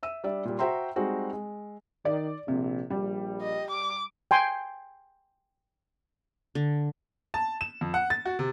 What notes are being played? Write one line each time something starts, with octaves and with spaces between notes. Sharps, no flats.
E5 E6 D#7
G3 D4 D5 E5
A#2 G3
F#4 C5 E5 G5 A#5 C6
G3 G#3 C4 D#4 F#4
G#3
D#3 D5
A#1 C3
A#1 G3
D#5
D6
G5 G#5 C6
D3
A5
E7
F2
F#5
A6
F#4
C3